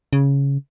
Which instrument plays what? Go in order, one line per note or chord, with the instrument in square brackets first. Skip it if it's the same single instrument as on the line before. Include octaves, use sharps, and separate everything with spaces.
[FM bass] C#3